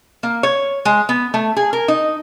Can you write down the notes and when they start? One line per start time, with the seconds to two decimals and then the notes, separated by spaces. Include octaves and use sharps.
0.23 A#3
0.43 C#5
0.85 G#3
1.09 B3
1.34 A3
1.56 G#4
1.73 A#4
1.88 D#4